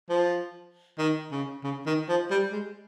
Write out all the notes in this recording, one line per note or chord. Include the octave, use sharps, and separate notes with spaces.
F3
D#3
C#3
C#3
D#3
F3
G3
G#3